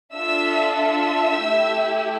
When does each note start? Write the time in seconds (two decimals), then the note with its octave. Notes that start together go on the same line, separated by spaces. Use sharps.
0.14 D4 F4 A4 E5 E6
0.77 E5 E6
1.41 A3 E4 G4